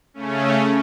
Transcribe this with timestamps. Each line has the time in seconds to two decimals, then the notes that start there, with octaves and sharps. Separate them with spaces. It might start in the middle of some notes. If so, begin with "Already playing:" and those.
0.14 C#3 A3 C#4